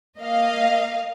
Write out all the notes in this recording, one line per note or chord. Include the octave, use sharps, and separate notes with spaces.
A#3 D#5 F5